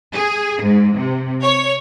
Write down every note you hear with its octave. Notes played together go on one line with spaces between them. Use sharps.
G#4
G#2
C3
C#5